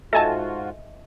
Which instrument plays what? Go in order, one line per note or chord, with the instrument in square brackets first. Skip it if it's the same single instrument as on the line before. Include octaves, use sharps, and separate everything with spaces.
[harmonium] G#2 F4 F#4 [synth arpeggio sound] A4 G#5 A5 [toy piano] D#5 E5